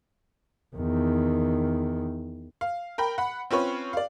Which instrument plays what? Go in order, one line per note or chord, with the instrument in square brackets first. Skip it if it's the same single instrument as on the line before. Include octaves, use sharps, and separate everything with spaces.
[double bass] E2 D#3
[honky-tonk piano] F5
A#4 G5 B5
F#5 B5
C4 C#4 F4 B4 C#5
D5 F5